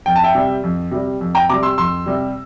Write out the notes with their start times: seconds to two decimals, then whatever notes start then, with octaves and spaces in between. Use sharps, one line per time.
0.06 F2 G5
0.16 A5
0.24 E5 G5
0.35 C3 G3
0.63 F2
0.91 C3 G3
1.21 F2
1.35 G5 A#5
1.49 C3 G3 A#5 D6
1.63 C6 E6
1.78 F2 C6 E6
2.06 C3 G3